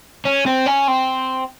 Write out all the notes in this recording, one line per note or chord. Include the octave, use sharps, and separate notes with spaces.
C#4
C4
C#4
C4